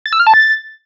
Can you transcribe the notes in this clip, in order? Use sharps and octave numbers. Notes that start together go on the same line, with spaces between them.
A6
E6
F6
A5
A6